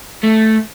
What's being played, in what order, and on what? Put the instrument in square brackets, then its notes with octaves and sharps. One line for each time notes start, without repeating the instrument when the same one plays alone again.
[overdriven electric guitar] A3